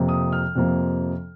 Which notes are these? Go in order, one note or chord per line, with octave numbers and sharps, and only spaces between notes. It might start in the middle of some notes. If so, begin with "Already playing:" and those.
Already playing: F2 C3 F3 A#3
D#6
F6
F2 C3 F3 A#3